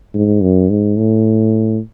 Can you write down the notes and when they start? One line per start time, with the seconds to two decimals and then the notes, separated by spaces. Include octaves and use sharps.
0.14 G#2
0.42 F#2
0.70 G#2
0.98 A2